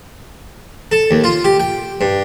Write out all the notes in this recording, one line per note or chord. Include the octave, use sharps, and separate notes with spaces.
A4
D#2
F4
G4
G5
G2